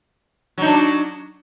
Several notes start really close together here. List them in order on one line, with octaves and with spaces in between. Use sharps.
F#3 D#4 D4